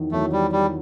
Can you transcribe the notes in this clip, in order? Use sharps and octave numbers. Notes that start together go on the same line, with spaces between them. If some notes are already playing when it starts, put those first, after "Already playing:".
Already playing: E2 D#3 F#3
E2 D#3 F#3 A3
G3
G3